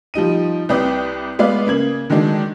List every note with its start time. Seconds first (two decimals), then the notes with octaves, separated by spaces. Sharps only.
0.14 F3 G3 D#4 D#7
0.69 C2 C4 B4 D5 G5 D#6
1.39 G#3 B3 B4 D5 F5
1.67 C#3 A#3 G#6 F#7
2.10 D3 D#3 F#3 G#3 D4